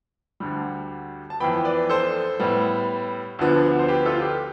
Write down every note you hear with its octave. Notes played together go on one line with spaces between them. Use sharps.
D2 D3 G3
A5
F2 E3 B3 G5 B5
B4 D5
A4 C5
A2 G3 B3
D2 D3 F3 B3
C5
G4 B4
F4 A4
G4 B4